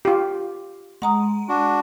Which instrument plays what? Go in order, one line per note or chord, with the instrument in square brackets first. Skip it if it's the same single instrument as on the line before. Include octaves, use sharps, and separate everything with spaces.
[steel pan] F4 G4
[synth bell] G#3 [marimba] F#5 A#5 D#6
[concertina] D4 F#4